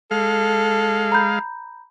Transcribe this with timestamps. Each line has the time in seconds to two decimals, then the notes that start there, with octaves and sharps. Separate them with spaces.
0.11 G#3 A4 F5
1.12 A#5 B5 G6